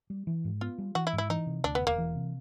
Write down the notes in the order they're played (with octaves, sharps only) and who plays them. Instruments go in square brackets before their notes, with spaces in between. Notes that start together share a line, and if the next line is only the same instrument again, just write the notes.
[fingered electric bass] G3
E3
G#2
[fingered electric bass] B3 [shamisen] F4
[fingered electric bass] G3
[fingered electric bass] E3 [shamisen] F#4
[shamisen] E4
[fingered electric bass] G#2
[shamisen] E4
[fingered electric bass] E3 [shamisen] D#4
[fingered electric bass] C3
[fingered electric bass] D2 [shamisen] D4
[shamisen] B3
[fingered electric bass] E1
[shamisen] A#3
[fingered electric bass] E3
C3